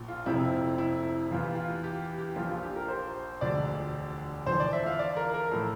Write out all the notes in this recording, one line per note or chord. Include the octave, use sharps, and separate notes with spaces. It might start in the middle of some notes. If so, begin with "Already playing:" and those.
Already playing: A#1 A#2
F4
F1 F2 C3 F3 E4
E4
E2 E3 F4
G4
F4
G4
G4
A#1 A#2 F3 F4
F4
G4
A#4
C5
E1 D2 D3 F3 D5
E2 D3 F3 C5
D5
E5
F5
D5
A#4
A#4
A2 F3 A4